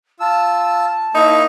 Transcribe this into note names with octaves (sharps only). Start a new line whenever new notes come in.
F4 A5 E6
A#3 D#4 E4 C#6